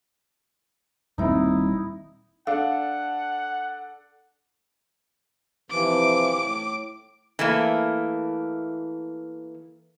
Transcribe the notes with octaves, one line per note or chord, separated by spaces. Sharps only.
D#1 G3 C4 D#4 E4
D4 A4 F5 F#5
C3 E3 F3 D6
A2
E3 A3 A#3